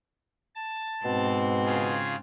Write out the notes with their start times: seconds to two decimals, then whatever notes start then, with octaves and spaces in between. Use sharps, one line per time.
0.55 A5
1.05 G#2 B2 C4
1.65 C#3 F4 G#4